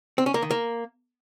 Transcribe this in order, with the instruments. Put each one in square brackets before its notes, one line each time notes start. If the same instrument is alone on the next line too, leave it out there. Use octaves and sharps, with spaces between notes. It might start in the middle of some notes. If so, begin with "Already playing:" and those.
[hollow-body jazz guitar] C4
C#4
A#3
D#3
A#3